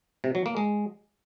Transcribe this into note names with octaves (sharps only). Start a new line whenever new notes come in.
C3
F#3
A#3
G#3